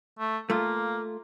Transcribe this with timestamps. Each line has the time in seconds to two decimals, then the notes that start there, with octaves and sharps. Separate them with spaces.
0.19 A3
0.50 A3 A#3 F4